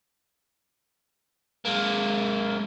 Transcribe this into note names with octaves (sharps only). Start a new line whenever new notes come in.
G#3 A#3